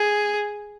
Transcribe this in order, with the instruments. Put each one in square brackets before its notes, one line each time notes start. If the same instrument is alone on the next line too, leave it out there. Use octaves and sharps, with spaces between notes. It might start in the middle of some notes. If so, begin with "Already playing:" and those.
Already playing: [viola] G#4